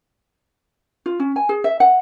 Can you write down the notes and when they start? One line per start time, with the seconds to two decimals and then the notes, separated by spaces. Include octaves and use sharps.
1.06 F4
1.20 C#4
1.36 G#5
1.49 G#4
1.64 E5
1.80 F#5